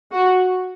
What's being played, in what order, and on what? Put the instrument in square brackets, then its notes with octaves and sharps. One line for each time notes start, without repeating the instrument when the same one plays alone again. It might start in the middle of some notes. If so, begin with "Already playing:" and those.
[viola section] F#4